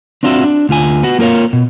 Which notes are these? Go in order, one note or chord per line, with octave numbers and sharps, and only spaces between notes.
C4 D4 F4 F#4 E5
D4
D2 F4 G#5
B3 F#4
A#3 F4 A#4 C#5 F5
B2